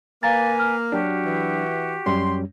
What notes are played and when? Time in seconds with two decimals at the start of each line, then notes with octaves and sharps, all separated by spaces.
0.23 A#3 B4 F5 G#5 A#5 A6
0.60 F6
0.92 F#3 D4 F#4 G4
1.26 E3
2.06 F#2 G3 C#4 C6